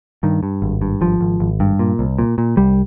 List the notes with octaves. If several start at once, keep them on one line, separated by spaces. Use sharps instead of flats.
G2 D#3
G2
G#1
G2
G#1 F3
G#1
G#1
G2
A#2
C2
A#2
A#2
C2 G3